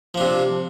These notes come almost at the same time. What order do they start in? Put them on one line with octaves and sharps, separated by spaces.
F3 D4 C3